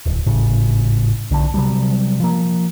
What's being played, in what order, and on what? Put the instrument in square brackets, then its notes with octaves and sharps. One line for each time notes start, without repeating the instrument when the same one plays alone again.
[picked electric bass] D1
G#1 A2 C#3
B1 D3 C4 D4
C3 D#3 F#3 G3
F3 A#3